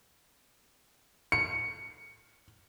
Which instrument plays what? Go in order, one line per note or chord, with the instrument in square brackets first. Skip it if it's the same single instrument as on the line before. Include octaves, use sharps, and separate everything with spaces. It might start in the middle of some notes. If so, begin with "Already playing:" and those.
[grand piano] C#7